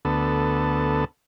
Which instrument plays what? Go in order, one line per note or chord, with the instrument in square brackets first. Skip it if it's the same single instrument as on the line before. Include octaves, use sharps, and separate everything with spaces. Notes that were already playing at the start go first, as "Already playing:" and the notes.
[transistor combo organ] D2 B3 A4